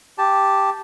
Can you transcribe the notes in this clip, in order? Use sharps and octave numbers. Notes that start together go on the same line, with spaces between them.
G4 A5